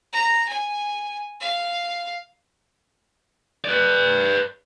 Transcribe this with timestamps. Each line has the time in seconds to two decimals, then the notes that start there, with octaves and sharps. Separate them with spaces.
0.13 A#5
0.49 G#5
1.41 F5
3.65 B4 D5